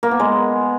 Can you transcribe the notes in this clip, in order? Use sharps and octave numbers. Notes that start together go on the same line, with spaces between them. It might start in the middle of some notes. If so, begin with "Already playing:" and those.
A#3
B3
G#3